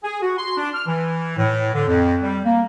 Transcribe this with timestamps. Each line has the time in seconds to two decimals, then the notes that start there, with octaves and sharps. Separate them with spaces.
0.03 G#4
0.22 F#4
0.38 C6
0.57 D4
0.74 F6
0.87 E3
1.37 A2
1.74 D3
1.87 F2
2.22 G3
2.45 A#3